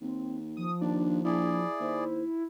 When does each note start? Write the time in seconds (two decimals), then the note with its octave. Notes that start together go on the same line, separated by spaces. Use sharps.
0.02 D#2 C4
0.57 F3 D#6
0.81 D#2 D4
1.25 A#1 E4 G#4 D5
1.80 D#2 C5